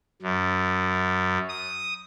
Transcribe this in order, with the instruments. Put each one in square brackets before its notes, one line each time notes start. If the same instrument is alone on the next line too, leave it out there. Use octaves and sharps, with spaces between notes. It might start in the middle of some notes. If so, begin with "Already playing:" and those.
[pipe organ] F#2
D#6